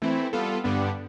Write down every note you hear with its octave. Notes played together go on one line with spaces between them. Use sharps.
E3 A3 C4 E4
G3 B3 F4 A4
G2 D3 G3 B3 D4